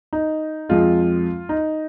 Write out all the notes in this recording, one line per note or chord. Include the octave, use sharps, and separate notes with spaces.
D#4
F2 F3 G#3 F4
D#4